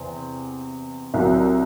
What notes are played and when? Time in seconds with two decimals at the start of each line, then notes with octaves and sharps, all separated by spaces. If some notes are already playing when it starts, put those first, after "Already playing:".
Already playing: E2 C3 C4
1.14 C2 C3 F#3